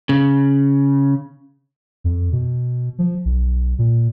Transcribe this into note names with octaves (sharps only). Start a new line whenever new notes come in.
C#3
F2
B2
F3
B1
A#2